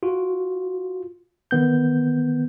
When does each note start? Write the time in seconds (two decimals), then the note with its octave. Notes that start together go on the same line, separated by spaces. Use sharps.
0.03 F4 F#4
1.51 D#3 B3 G6